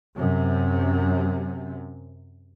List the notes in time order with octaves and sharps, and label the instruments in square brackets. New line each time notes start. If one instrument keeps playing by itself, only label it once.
[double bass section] F#2 C3